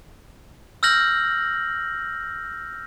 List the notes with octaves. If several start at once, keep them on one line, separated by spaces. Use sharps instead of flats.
E6 F6 G6 A#6 F#7